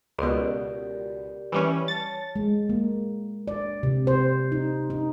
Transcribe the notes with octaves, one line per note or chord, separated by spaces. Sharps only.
C#2 B2 G4 A#4 D5
E3 G3 C#4
C#5 A5 A6
G#3
A#3
D5
C3
C5
D#4
D#4